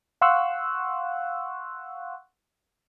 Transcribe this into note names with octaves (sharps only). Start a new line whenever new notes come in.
F5 F#5 C6 C#6 E6 F#6